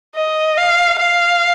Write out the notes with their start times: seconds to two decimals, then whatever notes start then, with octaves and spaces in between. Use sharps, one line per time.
0.15 D#5
0.57 F5
0.99 F5